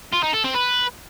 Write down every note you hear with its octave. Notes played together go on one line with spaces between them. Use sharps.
F4
D#4
A4
C4
B4